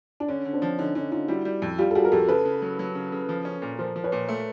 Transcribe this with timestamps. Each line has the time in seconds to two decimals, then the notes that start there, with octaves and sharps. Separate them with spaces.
0.20 D4
0.28 D3 C#4
0.45 D3
0.53 C4 D4
0.62 F3
0.78 D3 C#4 D#4
0.95 D3 C#4 D#4
1.12 D3 D#4 F4
1.28 G3 E4 F#4
1.45 G3
1.62 F2
1.78 G3 F4 G4
1.91 A4
1.95 G3 F#4 G#4
2.05 A#4
2.12 F2 G4 A4
2.28 C#3 A4 B4
2.45 C#3
2.62 F#3
2.79 F#3
2.95 C#3
3.12 C#3
3.29 F3
3.45 C#4
3.62 A#2
3.79 F3 A#4 C5
3.96 F3
4.04 B4 C#5
4.12 A#2
4.29 A3